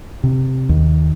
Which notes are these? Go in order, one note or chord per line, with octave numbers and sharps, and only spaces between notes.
C3
D#2